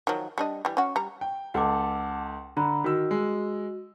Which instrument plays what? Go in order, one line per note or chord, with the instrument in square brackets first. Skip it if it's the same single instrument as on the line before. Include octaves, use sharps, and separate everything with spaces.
[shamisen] D#3 F3 F#3
G3 D4 D#5
E3 G3
C#4 F#4
G3 A#5
[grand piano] G5
[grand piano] C#2 A4 [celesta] F#5 A5 D6
[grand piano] D3 [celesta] A#5 B5
[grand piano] D#3 E6 [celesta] F#4
[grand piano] G#3